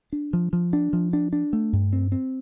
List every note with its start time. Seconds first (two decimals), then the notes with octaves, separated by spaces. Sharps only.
0.13 D4
0.33 F3
0.53 F3
0.73 D4
0.93 F3
1.13 D4
1.33 D4
1.53 A3
1.73 G2
1.93 C4
2.12 C4